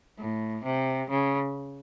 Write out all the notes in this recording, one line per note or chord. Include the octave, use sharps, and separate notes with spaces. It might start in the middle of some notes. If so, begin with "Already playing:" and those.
A2
C3
C#3